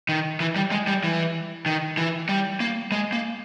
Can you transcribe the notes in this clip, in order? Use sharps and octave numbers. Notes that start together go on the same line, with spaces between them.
D#3
E3
G3
G#3
G3
E3
D#3
E3
G3
A#3
G#3
A#3